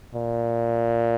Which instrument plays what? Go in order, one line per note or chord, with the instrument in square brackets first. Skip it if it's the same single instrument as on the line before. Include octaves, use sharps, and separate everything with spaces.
[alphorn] A#2